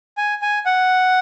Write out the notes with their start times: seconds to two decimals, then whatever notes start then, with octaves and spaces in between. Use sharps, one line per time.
0.17 G#5
0.42 G#5
0.66 F#5